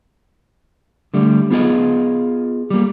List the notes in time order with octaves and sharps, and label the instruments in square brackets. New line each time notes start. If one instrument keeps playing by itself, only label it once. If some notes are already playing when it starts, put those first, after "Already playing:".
[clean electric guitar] D3 G3 A3
B3 F4 G#4 D#5
G3 A#3